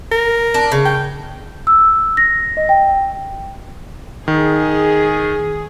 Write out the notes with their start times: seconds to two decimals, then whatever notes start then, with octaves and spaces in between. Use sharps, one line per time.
0.12 A#4
0.54 D4
0.72 C#3
0.86 G5
1.67 E6
2.17 A#6
2.57 D#5
2.69 G5
4.28 D#3 G#4